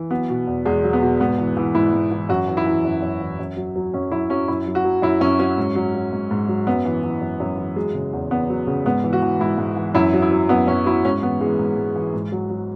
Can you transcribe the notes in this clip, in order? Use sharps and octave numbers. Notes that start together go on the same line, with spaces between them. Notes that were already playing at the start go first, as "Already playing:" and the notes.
Already playing: E3
F#3 B3
B2
E2
E2 G#3
F#3
B3
B2
G#2 B3
E3
E3
G#2 E4
G#2
E3
F#2 F#4
E3
E4
E3
F#2
F#2
E3
F#2
F#3
F#3
F#2 C#4
F#2 E4
F#3 C#4
F#2 E4
F#3
F#4
F#3
F#2 E4
F#2 C#4
F#3 C#4
G#2
F#3
F#3
G#2
G#2
F#3
F#2 B3
E3
E3
F#2
F#2
E3
F#3 G#3
C#3
E2
E2 B3
F#3
C#3
G#2 B3
E3
F#4
E3
G#2 E4
G#2
E3
F#2 E4
F#3
E4
F#3
F#2 B3
F#2 C#4
F#3 E4
G#2 C#4
E3 B3
E3 G#3
G#2
G#2
E3
G#2
F#3
F#3